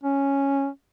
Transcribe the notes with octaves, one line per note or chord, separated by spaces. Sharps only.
C#4